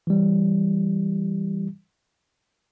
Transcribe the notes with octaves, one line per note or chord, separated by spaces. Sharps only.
E3 G3